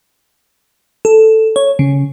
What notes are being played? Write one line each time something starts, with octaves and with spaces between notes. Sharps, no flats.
A4
C#5
C#3